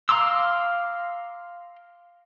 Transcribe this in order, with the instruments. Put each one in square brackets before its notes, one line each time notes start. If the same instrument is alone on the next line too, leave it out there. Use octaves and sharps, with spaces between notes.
[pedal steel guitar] F5 A#5 C6 D6 E6